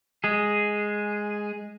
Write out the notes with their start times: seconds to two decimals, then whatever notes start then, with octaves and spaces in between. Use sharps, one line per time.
0.24 G#3 G#4